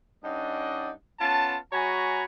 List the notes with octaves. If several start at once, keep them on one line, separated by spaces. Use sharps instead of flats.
G2 C#4 D#4 D5 D#5 F#5
B3 C#4 F4 A5
G#3 F#4 C#5 G#5 A#5 B5